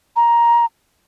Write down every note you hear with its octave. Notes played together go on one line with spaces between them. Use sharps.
A#5